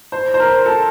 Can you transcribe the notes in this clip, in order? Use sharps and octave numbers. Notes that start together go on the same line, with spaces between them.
C5
C5
A#4
A4